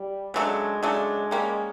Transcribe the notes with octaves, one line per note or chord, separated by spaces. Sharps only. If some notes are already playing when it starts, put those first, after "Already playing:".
Already playing: G3
C#3 F#3 G#3 A3 D4
C#3 F#3 G#3 A3 D4
G3 A#3 C#4